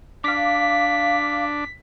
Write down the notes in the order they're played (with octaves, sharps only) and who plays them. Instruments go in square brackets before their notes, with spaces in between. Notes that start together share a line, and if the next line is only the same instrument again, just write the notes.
[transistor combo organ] D4 [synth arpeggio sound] F5 D6 [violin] B6